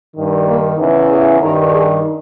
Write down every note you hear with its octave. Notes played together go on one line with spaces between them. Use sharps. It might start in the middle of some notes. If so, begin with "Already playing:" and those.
G2 D#3
A#3
E2 C#3 E3
G#4
G2 D#3 A#4
G#4